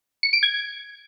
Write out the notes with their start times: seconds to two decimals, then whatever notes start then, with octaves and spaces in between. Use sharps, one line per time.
0.23 C#7
0.33 D7
0.43 G#6